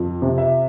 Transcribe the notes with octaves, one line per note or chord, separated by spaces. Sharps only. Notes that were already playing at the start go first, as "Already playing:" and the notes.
Already playing: F2
C3
E5